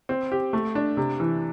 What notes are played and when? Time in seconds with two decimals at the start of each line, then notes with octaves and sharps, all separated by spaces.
0.09 C4
0.32 G4
0.53 A3
0.75 D4
0.97 C3
1.20 E3